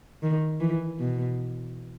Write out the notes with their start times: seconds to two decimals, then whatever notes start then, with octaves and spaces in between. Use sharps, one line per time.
0.22 D#3
0.60 E3
0.99 B2